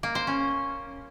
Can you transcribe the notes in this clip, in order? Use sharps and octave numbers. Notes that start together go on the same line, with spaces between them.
A#3
C5
C#4